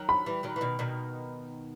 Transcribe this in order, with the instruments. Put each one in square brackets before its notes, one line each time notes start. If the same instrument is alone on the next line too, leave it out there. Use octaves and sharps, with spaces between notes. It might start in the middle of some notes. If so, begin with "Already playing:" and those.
Already playing: [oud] D#3 F#3
[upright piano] B5
[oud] E3 G3
D#3 F#3
E3
B2 D#3
B2 D#3